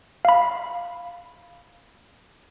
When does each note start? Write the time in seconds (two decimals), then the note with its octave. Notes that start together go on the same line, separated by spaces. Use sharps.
0.25 F5 B5